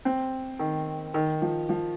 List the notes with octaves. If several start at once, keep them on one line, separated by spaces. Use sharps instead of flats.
C4
D#3
D#3
F3
F3